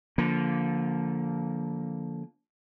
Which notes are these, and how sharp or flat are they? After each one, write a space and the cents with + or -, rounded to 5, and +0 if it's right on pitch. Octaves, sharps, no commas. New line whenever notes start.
D3 -20 F3 +0 A#3 +0